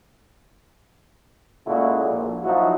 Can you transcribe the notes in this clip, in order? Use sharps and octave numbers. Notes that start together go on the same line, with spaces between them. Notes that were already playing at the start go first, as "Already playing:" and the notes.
A#2 C#3 G#3 A3 E4 F#4
A#1
F3 F#3 D#4 E4 F#4